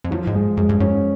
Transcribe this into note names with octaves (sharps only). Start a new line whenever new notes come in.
F2
F#2 F3
G#2
G#3
F#2 G#3
G2
F#2 C#4